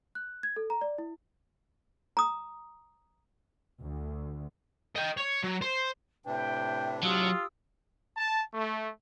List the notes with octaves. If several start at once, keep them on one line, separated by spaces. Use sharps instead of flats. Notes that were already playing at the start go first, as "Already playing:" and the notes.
F#6
G#6
A4
A#5
D5
E4
A#5 D#6
D2
D#5 G5
C#5
F#3
C5
A2 C3 D4 B4 E5 G5
F#3 F4 G4 D#6 E6
A5
A3